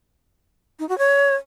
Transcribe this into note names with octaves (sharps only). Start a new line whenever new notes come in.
D#4
F#4
C#5